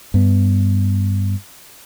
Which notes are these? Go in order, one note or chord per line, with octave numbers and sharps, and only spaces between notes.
G2 B3